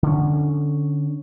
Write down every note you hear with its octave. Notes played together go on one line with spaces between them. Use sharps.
D3 C#4